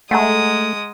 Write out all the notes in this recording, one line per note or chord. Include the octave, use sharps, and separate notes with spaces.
G#3 A3 F#5 G#5 A#5 D#6